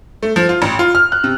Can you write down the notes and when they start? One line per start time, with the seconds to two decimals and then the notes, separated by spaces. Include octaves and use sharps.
0.23 A3
0.36 F3
0.49 F4
0.62 A1
0.79 F4
0.95 F6
1.12 F#6
1.24 C3